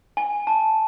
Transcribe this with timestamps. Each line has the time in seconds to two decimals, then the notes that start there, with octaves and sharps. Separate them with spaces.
0.17 G#5
0.47 A5